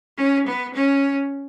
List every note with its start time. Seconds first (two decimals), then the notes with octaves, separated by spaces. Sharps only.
0.17 C#4
0.47 B3
0.74 C#4